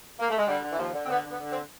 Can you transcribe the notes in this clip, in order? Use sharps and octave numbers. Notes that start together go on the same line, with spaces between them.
A#3
A3
G#3
D3 G3
D3
E3
D#2 F3
D3
C4
D3 B3
D3
B3
D3
C4